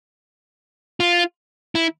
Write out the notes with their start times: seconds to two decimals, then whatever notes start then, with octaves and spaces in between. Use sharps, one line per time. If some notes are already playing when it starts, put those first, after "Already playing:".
1.00 F4
1.75 E4